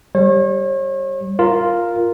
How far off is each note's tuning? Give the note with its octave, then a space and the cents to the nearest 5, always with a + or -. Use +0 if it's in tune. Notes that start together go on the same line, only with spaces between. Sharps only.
G3 +0 C#5 -40
F4 +0 A#4 +0